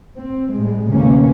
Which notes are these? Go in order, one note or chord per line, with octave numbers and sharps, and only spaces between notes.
C4
A2 G3 G#3
D2 C3 E3 A#3 C#4